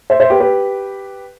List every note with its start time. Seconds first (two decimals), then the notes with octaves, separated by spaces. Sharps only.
0.10 C5 E5
0.20 C5 E5
0.30 G4 B4
0.40 G4 B4